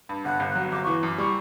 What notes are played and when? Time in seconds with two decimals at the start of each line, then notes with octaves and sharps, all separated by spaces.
0.09 G2
0.25 G1 F#5
0.40 G1
0.55 F#3
0.72 G1 D6
0.84 E3 C#6
1.03 F#2 D6
1.18 G3 C#6